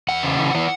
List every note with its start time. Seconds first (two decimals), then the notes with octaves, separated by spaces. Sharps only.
0.09 E2 F#5
0.23 C#3
0.39 E3
0.55 E3